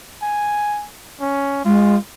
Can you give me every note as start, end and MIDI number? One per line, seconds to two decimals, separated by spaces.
0.22 0.86 80
1.21 1.61 61
1.65 1.95 56
1.65 1.97 65